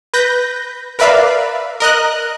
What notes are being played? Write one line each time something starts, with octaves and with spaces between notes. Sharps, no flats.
B4 G6 A#6
A#4 B4 D5 E5 F5 B5
A#4 D#5 F#6